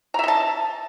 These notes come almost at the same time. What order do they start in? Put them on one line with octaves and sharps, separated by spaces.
A#5 E5 D#5 A5